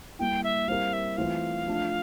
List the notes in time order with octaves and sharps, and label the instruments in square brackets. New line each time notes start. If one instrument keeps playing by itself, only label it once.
[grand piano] G3 A#3 E4 [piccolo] G5
[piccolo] E5
[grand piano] G3 C4 E4 G4 A#4 [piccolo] F5
[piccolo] E5
[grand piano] E3 A3 C4 F4 [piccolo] F5
[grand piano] F3 A3 D4